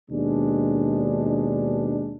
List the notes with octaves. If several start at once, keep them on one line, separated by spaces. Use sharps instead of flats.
D#2 B2 G#3 D4